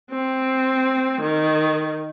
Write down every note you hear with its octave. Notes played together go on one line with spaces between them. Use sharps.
C4
D#3